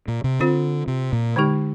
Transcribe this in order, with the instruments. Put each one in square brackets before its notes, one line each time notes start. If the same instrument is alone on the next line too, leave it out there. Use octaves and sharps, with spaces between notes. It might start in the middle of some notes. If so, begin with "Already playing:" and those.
[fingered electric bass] A#2
C3
[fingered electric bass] D3 [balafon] C4 F4 C5
[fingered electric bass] C3
A#2
[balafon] D3 G#3 D#4 G4